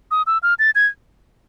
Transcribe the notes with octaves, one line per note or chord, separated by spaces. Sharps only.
D#6
E6
F6
A6
G#6